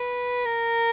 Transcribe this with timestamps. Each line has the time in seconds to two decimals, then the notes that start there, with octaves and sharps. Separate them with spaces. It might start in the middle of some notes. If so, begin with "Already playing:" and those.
Already playing: B4
0.46 A#4